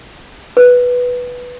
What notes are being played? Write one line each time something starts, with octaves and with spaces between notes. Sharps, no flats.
B4